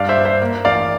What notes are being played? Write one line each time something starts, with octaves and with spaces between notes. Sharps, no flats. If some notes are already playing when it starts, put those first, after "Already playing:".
Already playing: G2 D5 F5
C5 E5
G2
C5 E5
A#3
A1 D5 F5